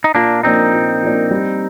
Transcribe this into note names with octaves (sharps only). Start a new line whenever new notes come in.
D#4
A#2 A#3 D4
F3 A#3 C4 D4 D#4
A#2
F3 A#3 D4
G3